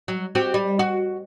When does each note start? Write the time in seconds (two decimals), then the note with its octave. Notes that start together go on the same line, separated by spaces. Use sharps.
0.08 F#3
0.35 C4 F#4 G4
0.54 G3
0.79 F#4